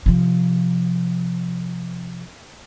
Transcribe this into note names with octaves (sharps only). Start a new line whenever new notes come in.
C3 F3